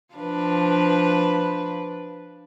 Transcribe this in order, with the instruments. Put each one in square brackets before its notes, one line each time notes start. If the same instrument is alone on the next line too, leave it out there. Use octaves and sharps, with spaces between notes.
[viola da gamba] F3 D4 B4